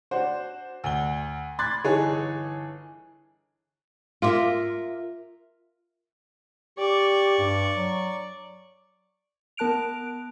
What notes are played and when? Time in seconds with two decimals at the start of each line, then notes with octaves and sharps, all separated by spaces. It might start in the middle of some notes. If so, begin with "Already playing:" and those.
0.11 D4 F#4 C5
0.84 D2 G7
1.59 B5 C6 F#6 G#6 A6
1.84 G1 E3 D#4 G#4 A4 C#5
4.22 F4 A#4 E5 F5 C6 D6
6.78 G4 D5 C#6
7.39 G2
7.75 F#3
9.57 B3 A#4 A5 F#6 D7 F7